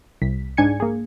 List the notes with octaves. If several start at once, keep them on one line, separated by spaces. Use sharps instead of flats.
C2 B6
G#2 D4 G#5 G#6 C#7
A#3 G#4